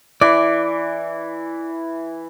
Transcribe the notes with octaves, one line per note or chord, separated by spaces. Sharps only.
E3 D5